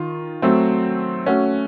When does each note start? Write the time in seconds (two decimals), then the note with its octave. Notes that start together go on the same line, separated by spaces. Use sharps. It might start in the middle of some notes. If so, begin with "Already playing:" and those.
Already playing: D#3 F4
0.42 F#3 A3 C4
1.26 A3 C#4 F#4